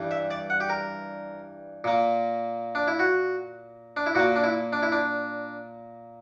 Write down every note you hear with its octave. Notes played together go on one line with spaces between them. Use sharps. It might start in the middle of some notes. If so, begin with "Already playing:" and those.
Already playing: G2 E3 G3
E5
D5
F#5
G4
A#4
A#2 A#3
D4
E4
F#4
D4
E4
A#2 A#3 F#4
D4
E4
D4
E4
D4